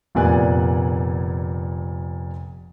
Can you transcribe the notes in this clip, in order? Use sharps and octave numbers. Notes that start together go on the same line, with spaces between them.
F1 A#2 B3 D5 G#5 F#6